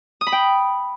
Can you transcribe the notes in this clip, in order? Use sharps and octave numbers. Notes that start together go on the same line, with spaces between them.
D#6
B5
G5